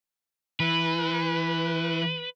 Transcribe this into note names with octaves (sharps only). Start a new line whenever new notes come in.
E3 B4